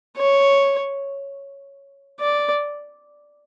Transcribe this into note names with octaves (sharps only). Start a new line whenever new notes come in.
C#5
D5